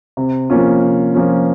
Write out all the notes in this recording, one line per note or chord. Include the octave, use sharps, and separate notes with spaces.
C3
F3 A#3 C#4 F4
C3
F3 A#3 C#4 F4